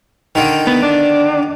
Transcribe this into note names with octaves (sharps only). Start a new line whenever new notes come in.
D3 D#3
B3
D4